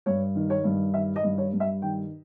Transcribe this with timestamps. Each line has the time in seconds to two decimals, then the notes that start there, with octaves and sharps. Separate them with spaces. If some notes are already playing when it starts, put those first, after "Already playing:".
0.06 G2 C#5
0.35 D#3
0.50 C#5
0.64 G2
0.94 D#3 E5
1.16 D#5
1.24 G2
1.38 C#5
1.53 G2
1.60 E5
1.82 D#3 G5